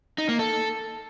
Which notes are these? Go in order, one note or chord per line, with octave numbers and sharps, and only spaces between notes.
D#4
A#3
A4